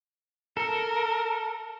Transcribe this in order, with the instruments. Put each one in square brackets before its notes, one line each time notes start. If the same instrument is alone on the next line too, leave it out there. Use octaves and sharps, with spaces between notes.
[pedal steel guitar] A4 [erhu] A#4